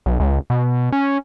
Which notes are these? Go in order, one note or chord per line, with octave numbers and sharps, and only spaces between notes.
B1
C#2
B2
C#4